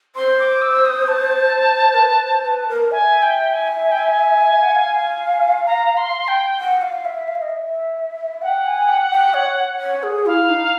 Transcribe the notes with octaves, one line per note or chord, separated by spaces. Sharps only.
C5 C6
D6
E6
D#6
A5
A#4
B4
C5
B4
A#4
E5 G#5
G5
G#5
G#5
G5
G#5
F#5
F5
A#5
C6
G5
F#5
F5
E5
F5
E5
D#5
E5
F#5 G5
G#5
G5
G5
C#5
C#5
G#4
E4 F5
D#4